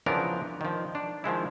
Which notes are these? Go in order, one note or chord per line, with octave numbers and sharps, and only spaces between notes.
C#3 E3 F3 B3 D4 A#4
D#3 F3
D4
D#3 F3 G#3 E4